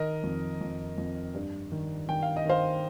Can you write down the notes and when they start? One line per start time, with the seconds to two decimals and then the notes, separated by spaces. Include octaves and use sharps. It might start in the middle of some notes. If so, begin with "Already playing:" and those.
Already playing: D#3 A#4 D#5
0.23 F2
0.61 F2
0.98 F2
1.35 G2
1.72 D#3
2.09 D#3 G5
2.23 F5
2.36 D#5
2.45 D#3 C5 F5